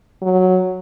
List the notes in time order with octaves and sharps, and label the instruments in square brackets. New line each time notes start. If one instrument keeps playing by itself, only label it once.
[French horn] F#3